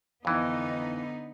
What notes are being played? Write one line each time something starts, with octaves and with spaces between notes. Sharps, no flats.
F2 D3 E3 B3 D#4